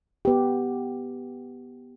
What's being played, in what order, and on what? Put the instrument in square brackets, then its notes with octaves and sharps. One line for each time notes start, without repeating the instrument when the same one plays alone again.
[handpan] B3 G4